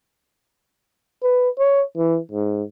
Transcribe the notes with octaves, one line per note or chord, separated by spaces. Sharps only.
B4
C#5
E3
G#2